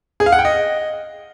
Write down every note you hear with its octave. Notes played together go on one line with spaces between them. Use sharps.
G#4
F5
F#5
G5
D#5